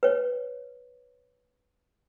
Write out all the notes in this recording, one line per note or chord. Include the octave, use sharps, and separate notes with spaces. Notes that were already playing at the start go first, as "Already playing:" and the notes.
B4 C#5